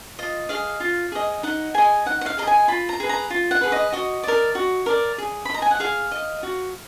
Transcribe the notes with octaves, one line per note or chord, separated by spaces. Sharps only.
F4 D#5
G#4 D#5 F5
F4
G#4 D#5
D#4 F#5
G#4 D#5 G#5
D#4 F#5
F#5
F5
G#4 D#5 A#5
G#5
F4 B5
A#5
G#4 B4
A#5
F4
F#5
G#4 B4
D#5
F#4 D#5
A#4 D5
F#4
A#4 D5
G#4
B5
D#5 A#5
G#5
F#5
G#4 F5
D#5
F#4